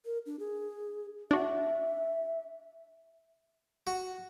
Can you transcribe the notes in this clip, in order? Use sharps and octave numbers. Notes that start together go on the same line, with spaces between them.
A#4
D4
G#4
D4 F#4 E5
F#4